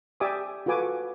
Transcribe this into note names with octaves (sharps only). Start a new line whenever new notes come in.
G4 D5 E5 G#5 D6 D#6
F4 F#4 A4 B4 G#5 D6